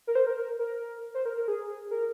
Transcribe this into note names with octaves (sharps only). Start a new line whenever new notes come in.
A#4
C5
A#4
A#4
A#4
C5
A#4
A#4
G#4
A#4